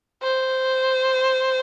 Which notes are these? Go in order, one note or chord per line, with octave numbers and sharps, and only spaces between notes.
C5